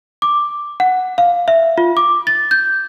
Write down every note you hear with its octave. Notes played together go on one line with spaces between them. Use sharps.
D6
F#5
F5
E5
F4
D6
A6
G6